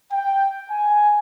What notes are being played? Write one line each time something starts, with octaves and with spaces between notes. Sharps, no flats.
G5
G#5